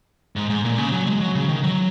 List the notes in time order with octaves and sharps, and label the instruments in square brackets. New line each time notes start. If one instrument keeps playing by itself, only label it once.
[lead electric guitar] G#2
G#2
A#2
C#3
F#3
G#3
F#3
C#3
D#3
F#3